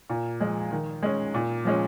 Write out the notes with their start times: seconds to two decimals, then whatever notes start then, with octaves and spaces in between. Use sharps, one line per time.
0.10 A#2
0.40 F3 G#3
0.71 D#3
1.03 G#3 C#4
1.34 A#2
1.65 F3 G#3 C#4